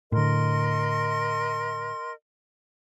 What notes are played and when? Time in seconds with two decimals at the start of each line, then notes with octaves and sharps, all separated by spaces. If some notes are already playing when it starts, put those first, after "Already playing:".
0.12 A2 D3 A#4 D#5 C6